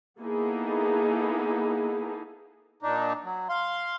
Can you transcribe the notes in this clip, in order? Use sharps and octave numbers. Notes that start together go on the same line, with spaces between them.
A#3 B3 D#4 E4 G#4 A4
A#2 D4 D#4
F#3
F5 C6